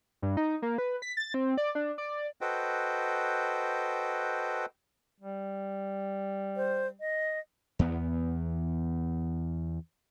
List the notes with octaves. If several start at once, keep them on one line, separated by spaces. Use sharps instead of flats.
G2
D#4
A#3
B4
B6
A6
C4
D5
D4
D5
F#4 A4 B4 C5 D#5 G5
G3
C5
D#5
E2 B3